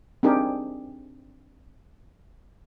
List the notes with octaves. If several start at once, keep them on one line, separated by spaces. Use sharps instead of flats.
C4 D4 D#4 G4 G#4 A#4